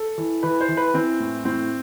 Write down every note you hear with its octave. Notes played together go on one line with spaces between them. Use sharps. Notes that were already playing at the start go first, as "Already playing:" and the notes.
Already playing: A4
E3
E3 B4
C5
E3
B4
E3 C4
A2
A2 C4